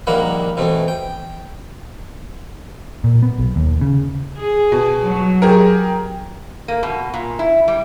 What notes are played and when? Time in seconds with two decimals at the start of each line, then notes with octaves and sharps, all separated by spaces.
0.07 A#1 D#3 G3 A#3 E4 F#5
0.57 B2 E3 A3 C4
0.88 G5
3.04 A#2
3.22 B3
3.38 B1
3.56 D#2
3.81 C#3
4.40 G#4
4.72 B2
5.03 F#3
5.42 G4 G#4 A#4
6.68 A#3
6.83 B2
7.14 A#2
7.39 E4
7.68 G3